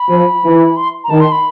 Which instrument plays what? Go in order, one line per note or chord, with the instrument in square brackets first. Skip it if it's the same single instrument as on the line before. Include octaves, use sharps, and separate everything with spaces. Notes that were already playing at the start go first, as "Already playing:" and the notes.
Already playing: [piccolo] B5
[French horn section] F3
E3
[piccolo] C6
A#5
[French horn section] D#3 [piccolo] A5
[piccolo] C6
B5